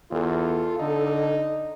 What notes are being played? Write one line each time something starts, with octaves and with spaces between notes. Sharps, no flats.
E2 F4 A4
D3 D#4